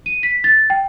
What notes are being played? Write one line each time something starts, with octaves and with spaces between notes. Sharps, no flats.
D#7
B6
A6
G5